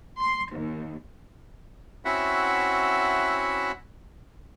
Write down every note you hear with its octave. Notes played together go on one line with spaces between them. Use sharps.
C6
D#2
C4 C#4 E4 F#4 E5 F#5